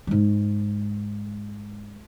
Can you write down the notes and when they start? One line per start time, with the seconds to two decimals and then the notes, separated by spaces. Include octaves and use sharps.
0.07 G#2 G#3